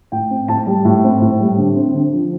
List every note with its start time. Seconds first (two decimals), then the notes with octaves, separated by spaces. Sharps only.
0.12 A2 G5
0.30 C4
0.48 A2 A5
0.67 G3
0.85 A2
1.03 C4
1.21 A2
1.40 G3
1.58 D3
1.76 C4
1.94 D3
2.13 F3